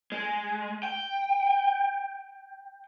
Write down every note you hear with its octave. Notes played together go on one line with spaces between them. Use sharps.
G#3
G5